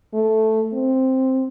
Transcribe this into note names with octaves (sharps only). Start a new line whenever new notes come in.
A3
C4